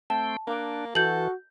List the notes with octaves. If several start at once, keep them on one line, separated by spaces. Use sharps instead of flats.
A3 C4 G5 A5
A#3 D4
E3 F#4 A4 G6 F#7